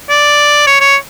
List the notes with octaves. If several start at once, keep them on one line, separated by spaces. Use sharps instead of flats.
D5
C#5
C#5